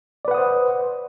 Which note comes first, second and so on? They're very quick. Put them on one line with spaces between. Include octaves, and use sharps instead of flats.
D5 B4 F#5 D#6 C5